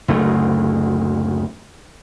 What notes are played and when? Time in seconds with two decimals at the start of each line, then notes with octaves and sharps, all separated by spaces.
0.08 F#1 D2 A3